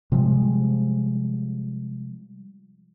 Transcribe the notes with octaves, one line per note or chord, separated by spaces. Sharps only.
C3 F3 G3 G#3